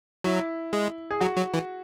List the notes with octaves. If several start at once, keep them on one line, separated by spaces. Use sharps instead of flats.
F#3 E4
G#3
G#4
F#3 F#4
F#3
E3